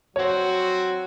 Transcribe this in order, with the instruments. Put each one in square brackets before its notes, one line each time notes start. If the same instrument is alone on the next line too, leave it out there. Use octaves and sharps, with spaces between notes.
[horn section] F#3 C4 F#4 C5 [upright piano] C#5